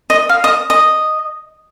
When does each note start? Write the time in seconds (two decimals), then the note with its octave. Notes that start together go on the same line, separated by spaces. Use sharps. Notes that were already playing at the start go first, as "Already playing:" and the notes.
0.10 D#5
0.29 F5
0.44 D#5
0.70 D#5